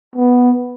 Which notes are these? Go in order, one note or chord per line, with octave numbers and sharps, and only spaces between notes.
B3